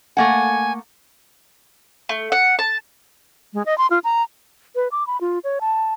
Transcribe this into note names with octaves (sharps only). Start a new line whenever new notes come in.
A3 A#3 F#5 G#5
A3
F#5
A5
G#3
D#5
C6
F4
A#5
B4
D6
B5
F4
C#5
A5